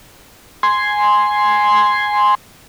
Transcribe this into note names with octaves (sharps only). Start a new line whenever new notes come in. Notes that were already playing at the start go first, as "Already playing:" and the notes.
G#5 C6